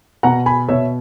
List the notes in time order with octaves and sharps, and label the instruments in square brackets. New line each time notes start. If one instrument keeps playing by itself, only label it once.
[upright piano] B2 F#5 A#5
G#5 B5
B2 C#5 E5